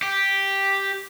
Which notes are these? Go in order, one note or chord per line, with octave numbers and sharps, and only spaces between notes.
G4